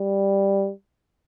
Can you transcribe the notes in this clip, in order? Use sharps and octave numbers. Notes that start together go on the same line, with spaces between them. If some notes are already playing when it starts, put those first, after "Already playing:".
Already playing: G3